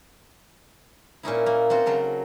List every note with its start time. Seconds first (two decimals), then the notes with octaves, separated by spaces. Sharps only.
1.23 A#2 C#4 D#4 E4
1.46 A#3
1.70 C4 F4 F#4
1.86 C#3 F#3 A4 A#4